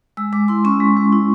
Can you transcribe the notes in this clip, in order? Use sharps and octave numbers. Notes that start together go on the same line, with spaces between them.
G#3 E6
G#3 D6
E4 C6
C#4 C#6
G#3
G#3
E4